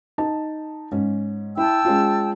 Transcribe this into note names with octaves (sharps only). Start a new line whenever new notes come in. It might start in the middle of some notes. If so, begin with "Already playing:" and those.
D#4 A5
G#2 C#4
E4 G5 A5 E6
G#3 C#4 F4